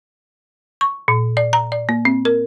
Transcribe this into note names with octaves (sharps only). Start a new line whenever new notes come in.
C#6
A#2
D5
A#5
D5
A#3
C4
A#4